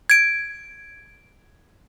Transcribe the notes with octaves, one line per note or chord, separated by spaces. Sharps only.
G#6 D7